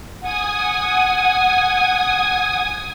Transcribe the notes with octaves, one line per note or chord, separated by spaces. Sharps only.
F#5 G#5 D#6